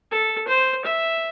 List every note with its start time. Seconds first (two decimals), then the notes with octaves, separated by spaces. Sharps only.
0.11 A4
0.48 C5
0.86 E5